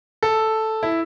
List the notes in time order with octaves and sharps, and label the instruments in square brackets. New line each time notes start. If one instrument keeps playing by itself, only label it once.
[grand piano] A4
E4